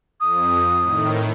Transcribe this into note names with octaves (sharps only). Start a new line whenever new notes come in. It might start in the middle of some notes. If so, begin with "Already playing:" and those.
F2 D#6
A2 D#3